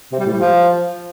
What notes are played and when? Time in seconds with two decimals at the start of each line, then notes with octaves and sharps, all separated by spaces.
0.12 C3
0.19 G3
0.26 A2
0.33 G3
0.40 F3